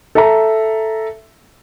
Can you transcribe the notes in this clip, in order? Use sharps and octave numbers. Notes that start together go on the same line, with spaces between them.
A4 E5 A#5